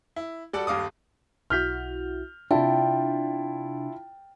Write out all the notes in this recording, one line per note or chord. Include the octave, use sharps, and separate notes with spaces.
E4
G3 F#4 A4 D5 F#5
D#1 G2 F5 D6 D#6
B1 E4 F#4 F6 G6 B6
C3 D4 E4 F4 G5 A5